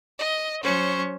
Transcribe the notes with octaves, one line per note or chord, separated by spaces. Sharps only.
D#5
F#3 C#4 C5 C#6